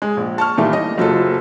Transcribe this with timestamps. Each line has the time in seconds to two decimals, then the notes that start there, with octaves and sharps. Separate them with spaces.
0.02 G#3
0.17 A#1
0.38 A5 C#6 F6
0.58 A#2 D#3 E3 G3 A3
0.73 D#5
0.98 F#1 F#3 F4 A4